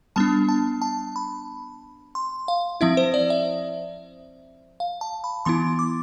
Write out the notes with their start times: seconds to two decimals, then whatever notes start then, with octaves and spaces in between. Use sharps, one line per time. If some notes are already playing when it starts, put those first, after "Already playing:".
0.16 G3 B3 D4 A5
0.49 A5
0.82 A5
1.16 B5
2.15 C6
2.48 F5
2.81 F3 C4 E4 E5
2.97 C5
3.14 D5
3.30 E5
4.80 F5
5.01 A5
5.24 B5
5.45 E3 B3 E4 C6
5.79 D6